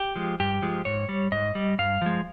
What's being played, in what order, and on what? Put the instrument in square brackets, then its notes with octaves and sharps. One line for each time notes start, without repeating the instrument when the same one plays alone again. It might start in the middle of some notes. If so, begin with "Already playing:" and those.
Already playing: [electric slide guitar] G4
F3 G#3
G2 G4
F3 G#3
G#2 C#5
G3
G#2 D#5
G3
G2 F5
F3 G#3